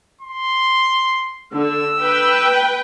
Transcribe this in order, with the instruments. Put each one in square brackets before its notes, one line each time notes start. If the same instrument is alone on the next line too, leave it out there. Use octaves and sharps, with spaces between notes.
[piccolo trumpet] C6
[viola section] D3 [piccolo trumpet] E6
[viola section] B4 G5